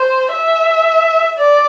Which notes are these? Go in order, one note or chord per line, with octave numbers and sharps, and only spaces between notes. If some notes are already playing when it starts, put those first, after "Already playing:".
Already playing: C5
E5
D5